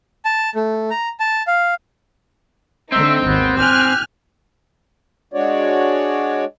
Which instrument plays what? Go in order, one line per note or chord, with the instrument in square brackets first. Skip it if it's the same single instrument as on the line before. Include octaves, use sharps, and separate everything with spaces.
[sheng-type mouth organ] A5
A3
A#5
A5
F5
[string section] D3 A3 D#4 [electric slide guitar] C4 [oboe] E5
[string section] G#1 D#2 [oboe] B3
[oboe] G4 [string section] G#5 F6 F#6
[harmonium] G#3 D4 F#4 C#5 D5